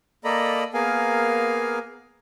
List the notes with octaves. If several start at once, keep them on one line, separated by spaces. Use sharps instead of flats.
A#3 A4 D5 D#5 A#5 B5
A#3 B3 G#4 A#4 F5 G#5